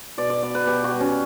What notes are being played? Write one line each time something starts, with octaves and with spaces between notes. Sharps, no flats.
B2 D5
D5
B3 D5
B4
B2 G4
F#4
G3
C#4